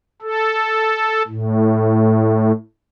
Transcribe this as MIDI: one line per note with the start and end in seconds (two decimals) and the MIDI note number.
0.22 1.22 69
1.28 2.52 45